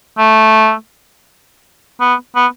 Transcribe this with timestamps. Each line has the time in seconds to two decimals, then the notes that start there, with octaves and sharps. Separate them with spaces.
0.18 A3
2.00 B3
2.36 B3